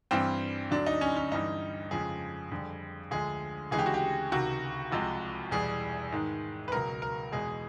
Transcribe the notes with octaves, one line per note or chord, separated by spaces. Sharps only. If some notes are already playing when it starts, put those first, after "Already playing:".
G2 E3 G3 C4
D2 D3 F#3 D4
D#4
C#4
C#4
G2 E3 G3 D#4
F2 C#3 F3 G#3 G#4
F2 D3 G3
D2 D3 F3 G#3 G#4
D2 C#3 E3 G#3 G#4
G4
F#4
G4
C#2 C3 D#3 F#4
C2 C3 F3 G#3
E2 B2 G3 G#4
G#2 D#3 G#3
B4
C#2 B2 F#3 A#4
A#4
E2 B2 G#3 G#4